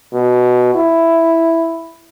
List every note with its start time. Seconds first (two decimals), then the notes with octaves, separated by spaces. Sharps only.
0.14 B2
0.75 E4